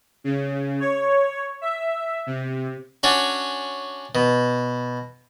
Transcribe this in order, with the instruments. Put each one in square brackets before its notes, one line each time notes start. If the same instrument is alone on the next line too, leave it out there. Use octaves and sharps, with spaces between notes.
[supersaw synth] C#3
C#5
E5
C3
[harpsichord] C#4 D4 F#4
B2